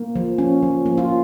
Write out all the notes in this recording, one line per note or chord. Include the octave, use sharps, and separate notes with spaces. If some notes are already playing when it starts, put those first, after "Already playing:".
Already playing: A#3
F3
C#4
F3
A#3
F4